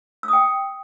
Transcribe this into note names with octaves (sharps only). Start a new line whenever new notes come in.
E6
D#6
G5